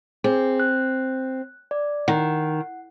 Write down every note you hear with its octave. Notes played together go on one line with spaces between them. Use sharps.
C4 G#4
F#6
D5
D#3 F#5